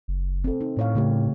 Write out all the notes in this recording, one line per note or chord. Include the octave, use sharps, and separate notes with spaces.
F#1
C4 A4
D#4
A2 A3 C#5 F5
C#3 A3 G4